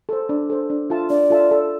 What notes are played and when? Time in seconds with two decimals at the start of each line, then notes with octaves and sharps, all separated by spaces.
0.09 A4 C5
0.29 D4
0.50 A4 C5
0.70 D4
0.90 F4 A4 E5 A5
1.10 D4 D5
1.30 F4 A4 E5 A5
1.51 A4